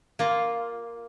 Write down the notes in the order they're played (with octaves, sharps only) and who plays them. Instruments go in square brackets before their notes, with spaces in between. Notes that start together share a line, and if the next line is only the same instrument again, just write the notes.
[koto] A#3 F4